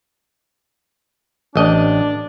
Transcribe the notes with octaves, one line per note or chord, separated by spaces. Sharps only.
A1 D4 D#5